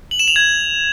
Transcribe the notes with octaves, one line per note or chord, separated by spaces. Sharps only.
F#7
E7
F7
G#6